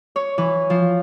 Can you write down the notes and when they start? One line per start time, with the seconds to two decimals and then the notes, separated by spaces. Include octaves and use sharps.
0.16 C#5
0.38 E3
0.70 F3